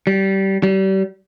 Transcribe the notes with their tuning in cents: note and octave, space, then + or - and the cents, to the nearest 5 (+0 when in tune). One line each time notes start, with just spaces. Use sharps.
G3 -20
G3 -35